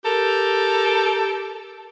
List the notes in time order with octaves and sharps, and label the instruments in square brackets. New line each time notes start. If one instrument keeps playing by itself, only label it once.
[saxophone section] G4 A4 A#4